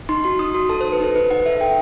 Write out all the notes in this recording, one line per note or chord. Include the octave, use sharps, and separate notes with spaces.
D#4 C6
F#4 C6
D#4 D#6
F#4 C6
A4 A5
C5
A4
B4
D#4 A4
D#4 B4
D#4 F#5
A4 E5
A4 G5